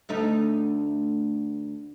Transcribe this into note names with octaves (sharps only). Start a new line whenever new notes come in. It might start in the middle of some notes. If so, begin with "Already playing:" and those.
D2 A3 D#4